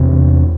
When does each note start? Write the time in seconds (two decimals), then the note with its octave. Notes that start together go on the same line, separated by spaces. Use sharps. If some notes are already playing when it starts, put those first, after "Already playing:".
Already playing: E2 C3